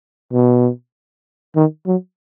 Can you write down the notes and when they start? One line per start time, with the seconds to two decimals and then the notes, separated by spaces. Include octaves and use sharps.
0.33 B2
1.56 D#3
1.86 F#3